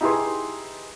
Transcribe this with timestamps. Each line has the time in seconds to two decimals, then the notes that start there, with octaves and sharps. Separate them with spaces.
0.01 D#4 E4 G4 G#4 B4 C6